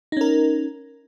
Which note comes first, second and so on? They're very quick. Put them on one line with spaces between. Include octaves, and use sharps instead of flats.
D#4 C#4 A#4